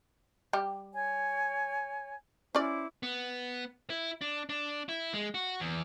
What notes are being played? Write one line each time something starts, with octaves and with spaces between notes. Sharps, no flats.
G3 G4
C#5 G#5
C#4 E4 C5 D5 D6
B3
E4
D4
D4
E4
G#3
F#4
E2